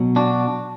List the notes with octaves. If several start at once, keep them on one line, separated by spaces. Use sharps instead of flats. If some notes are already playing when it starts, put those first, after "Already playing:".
Already playing: B2 F#3
D4 F#4